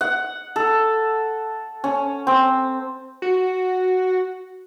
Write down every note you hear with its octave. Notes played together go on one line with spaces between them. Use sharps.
F#5
A4
C#4
C4
F#4